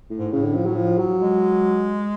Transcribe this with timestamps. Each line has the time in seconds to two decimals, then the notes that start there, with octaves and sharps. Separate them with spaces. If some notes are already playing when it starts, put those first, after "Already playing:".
0.10 A2
0.17 G#2
0.32 A2 C#3
0.43 D3
0.55 F3
0.66 F#3
0.76 F3
0.98 F#3
1.21 G#3